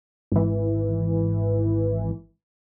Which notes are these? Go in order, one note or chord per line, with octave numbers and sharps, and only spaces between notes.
G#1 E3